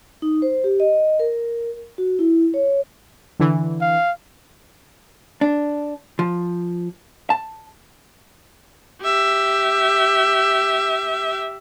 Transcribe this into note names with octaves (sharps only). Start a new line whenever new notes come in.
D#4
C5
G4
D#5
A#4
F#4
E4
C#5
D3 E3
F5
D4
F3
A5
G4 E5